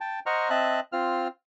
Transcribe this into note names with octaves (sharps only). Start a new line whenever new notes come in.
G5 A5
C5 D#5 F#5 A#5 C#6 F6
C4 D#5 E5 A5 F#6
C4 F4 F6